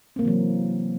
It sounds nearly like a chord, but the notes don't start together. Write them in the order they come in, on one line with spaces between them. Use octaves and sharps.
C4 A#3 C3 E3 F#3